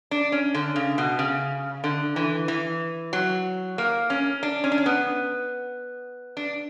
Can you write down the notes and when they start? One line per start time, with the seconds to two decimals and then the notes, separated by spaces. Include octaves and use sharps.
0.11 D4
0.32 C#4
0.54 D3
0.76 C#3
0.98 B2
1.19 C#3
1.84 D3
2.16 E3
2.48 E3
3.13 F#3
3.78 A#3
4.10 C#4
4.43 D4
4.64 C#4
4.72 D4
4.78 C#4
4.86 B3
6.37 D4